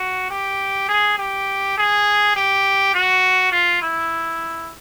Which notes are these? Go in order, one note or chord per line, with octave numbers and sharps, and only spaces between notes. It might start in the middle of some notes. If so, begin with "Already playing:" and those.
Already playing: F#4
G4
G#4
G4
G#4
G4
F#4
F4
E4